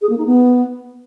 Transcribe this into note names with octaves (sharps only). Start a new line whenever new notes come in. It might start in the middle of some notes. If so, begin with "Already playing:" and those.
G#4
A#3
D#4
B3